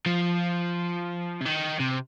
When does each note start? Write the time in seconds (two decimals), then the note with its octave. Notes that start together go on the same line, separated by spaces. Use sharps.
0.06 F3
1.41 C3
1.46 D#3
1.80 C3